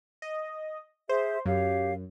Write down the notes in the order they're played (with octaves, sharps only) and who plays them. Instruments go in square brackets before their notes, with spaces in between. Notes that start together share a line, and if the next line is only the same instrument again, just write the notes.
[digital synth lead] D#5
[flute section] G#4 E5 [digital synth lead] C5
[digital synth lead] F#2 [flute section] G4 C#5 F5